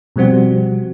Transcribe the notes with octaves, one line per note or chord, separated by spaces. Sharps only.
B2 F3 G3 C4 F#4